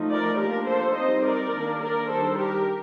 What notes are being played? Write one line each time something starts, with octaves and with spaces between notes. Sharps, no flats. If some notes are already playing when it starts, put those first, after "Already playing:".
Already playing: F3 A3 D#4
A#4 D5
F3 A#3 D4 G4 A#4
A4 C5
G3 C4 D#4 C5 D#5
A#4 D5
D#3 A#3 D4
A#4 D5
D#3 G3 D4 A4 C5
G4 A#4